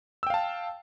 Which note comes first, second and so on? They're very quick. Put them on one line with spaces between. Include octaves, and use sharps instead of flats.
E6 G5 F5 A5